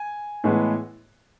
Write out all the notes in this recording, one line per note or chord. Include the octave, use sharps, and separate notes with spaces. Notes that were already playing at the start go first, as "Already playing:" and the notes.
Already playing: G#5
A2 E3 G#3 B3